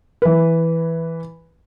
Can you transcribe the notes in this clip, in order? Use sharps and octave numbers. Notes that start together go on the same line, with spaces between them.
E3 B4